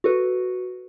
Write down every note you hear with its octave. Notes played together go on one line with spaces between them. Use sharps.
F#4 A4 B4